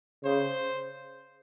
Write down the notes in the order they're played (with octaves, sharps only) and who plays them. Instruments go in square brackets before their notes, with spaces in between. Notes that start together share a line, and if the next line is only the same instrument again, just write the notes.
[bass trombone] C#3 [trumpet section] C5